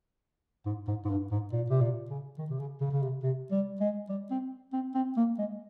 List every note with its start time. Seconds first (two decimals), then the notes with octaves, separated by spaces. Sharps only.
0.66 G#2
0.88 G#2
1.05 G#2
1.10 G2
1.31 G#2
1.52 A#2
1.70 C3
1.81 A#2
2.10 C#3
2.38 D#3
2.50 C3
2.60 C#3
2.81 C#3
2.91 C#3
3.03 C3
3.23 C3
3.52 G3
3.80 G#3
4.09 G3
4.31 C4
4.73 C4
4.95 C4
5.17 A#3
5.38 G#3